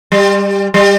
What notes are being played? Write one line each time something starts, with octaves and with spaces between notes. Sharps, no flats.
G3
G3